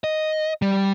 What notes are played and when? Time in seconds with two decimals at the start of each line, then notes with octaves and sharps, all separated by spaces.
0.04 D#5
0.62 G3